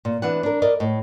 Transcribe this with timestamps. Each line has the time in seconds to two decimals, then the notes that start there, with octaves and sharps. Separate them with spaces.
0.05 A#2
0.22 E3 B3 D4 F#5
0.43 D4 A#4
0.62 A#4 D5 D#5
0.80 A2 D#5